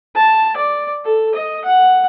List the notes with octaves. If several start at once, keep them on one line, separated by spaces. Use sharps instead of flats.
A5
D5
A4
D#5
F#5